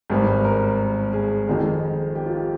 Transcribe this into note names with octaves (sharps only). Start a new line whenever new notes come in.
G#1 G2 G3
A#4
G#4
F2 D#3 G#3
G#4
G4
F4
G4